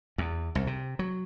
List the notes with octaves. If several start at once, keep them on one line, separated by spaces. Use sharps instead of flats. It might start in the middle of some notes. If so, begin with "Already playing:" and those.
E2
C2
C3
F#3